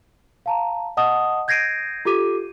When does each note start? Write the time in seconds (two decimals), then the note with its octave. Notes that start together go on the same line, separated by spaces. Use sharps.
0.46 F5 A5 A#5
0.97 D#5 F#5 A5 D#6
1.48 G6 G#6 A#6 C7 D7 D#7
2.05 F4 G4 A4 D6 D#7